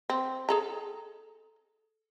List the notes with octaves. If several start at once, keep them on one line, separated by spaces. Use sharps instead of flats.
C4
G#4 A4 A#5